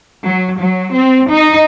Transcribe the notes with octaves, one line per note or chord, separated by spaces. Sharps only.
F#3
F#3
C4
D#4